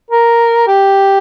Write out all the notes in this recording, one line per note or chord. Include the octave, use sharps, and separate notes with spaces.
A#4
G4